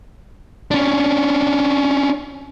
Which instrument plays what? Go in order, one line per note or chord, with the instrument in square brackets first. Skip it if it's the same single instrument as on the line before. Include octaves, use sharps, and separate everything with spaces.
[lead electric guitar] C#4 D4